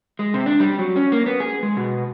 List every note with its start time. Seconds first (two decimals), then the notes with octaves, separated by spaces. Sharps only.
0.19 G#3
0.34 C3
0.46 D4
0.60 G3
0.79 F#3
0.96 C#4
1.12 A#3
1.26 B3
1.40 G#4
1.63 G#3
1.77 B2